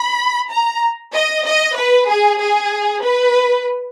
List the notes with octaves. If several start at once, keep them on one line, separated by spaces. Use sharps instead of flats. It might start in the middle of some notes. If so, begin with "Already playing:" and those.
Already playing: B5
A#5
D#5
D#5
B4
G#4
G#4
B4